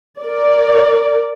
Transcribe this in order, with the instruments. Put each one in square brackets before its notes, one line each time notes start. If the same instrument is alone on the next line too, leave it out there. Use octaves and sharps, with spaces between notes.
[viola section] A#4 D5